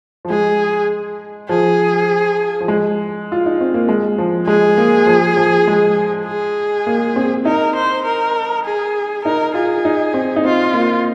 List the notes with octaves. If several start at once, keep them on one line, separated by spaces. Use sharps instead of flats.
F3
G#3 G#4
F3 G#4
F3
G#3
F4
D#4
C4
A#3
G#3
F3
G#3 G#4
A#3
F3
F3
G#3
G#4
A#3
C4
D#4 A#4
C5
A#4
G#4
D#4 A#4
F4 G#4
D#4
C4
D#4
C4 F4
A#3